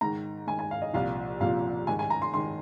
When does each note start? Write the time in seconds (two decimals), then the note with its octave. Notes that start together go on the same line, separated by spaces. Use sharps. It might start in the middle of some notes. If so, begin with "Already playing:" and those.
0.01 G#2 D#3 A#5
0.47 G#2 D#3 G#5
0.59 G#5
0.71 F5
0.82 D#5
0.93 C2 A#2 F3 F5
1.40 C2 A#2 F3 F5
1.87 G#2 D#3 G#5
1.99 G#5
2.10 A#5
2.22 C6
2.34 G#2 D#3 C6